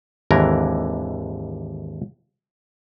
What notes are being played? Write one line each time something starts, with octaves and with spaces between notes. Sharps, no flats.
G#1 D#2 D3 E3 A#4